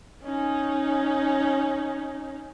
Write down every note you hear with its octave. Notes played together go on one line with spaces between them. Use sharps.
C#4 D#4